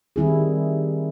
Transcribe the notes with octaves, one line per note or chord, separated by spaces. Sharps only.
D#3 G3 C4 E4 G#4